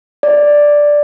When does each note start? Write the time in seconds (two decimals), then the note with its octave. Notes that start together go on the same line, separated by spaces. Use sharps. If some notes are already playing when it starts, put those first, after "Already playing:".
0.23 D5